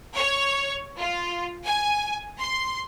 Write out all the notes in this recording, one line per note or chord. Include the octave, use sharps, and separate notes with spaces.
C#5
F4
G#5
C6